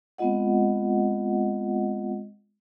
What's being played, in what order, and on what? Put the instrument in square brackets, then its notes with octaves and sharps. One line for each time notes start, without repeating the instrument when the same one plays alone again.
[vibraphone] G#3 B3 C4 F4 D#5 F#5